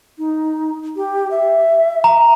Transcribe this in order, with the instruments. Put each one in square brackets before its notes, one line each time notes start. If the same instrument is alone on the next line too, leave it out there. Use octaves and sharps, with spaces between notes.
[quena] D#4
G4
E5
[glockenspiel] A#5